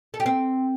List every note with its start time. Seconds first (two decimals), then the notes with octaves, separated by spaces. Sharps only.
0.14 A4
0.20 G4
0.26 C4